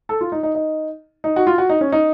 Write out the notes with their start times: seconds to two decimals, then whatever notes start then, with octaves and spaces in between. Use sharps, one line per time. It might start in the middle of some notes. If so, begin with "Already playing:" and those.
0.09 A4
0.21 F4
0.32 D#4
0.43 D#4
0.55 D#4
1.24 D#4
1.36 F#4
1.47 F4
1.58 F#4
1.70 D#4
1.81 C#4
1.92 D#4